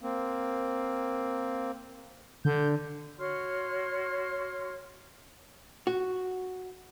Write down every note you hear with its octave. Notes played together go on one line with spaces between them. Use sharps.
A#3 C4
D3 G6
F#4 C#5 C6 F6
F#4